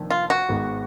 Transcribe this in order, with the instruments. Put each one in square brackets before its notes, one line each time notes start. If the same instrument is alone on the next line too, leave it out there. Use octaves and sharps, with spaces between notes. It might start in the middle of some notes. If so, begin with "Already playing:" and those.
Already playing: [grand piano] F1 F2 D#3 A#3 D4
[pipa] F4
F#4
[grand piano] G#1 G#2 D#3 G#3 B3